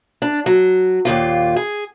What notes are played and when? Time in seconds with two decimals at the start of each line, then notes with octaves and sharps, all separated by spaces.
0.22 D4
0.46 F#3
1.05 D#2 A#2 F4
1.56 G#4